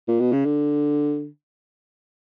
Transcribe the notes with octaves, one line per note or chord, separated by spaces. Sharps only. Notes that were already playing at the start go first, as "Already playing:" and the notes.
A#2
B2
C#3
D3